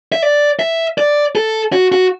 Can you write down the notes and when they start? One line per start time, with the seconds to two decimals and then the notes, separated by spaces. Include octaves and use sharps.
0.12 E5
0.22 D5
0.59 E5
0.98 D5
1.35 A4
1.73 F#4
1.92 F#4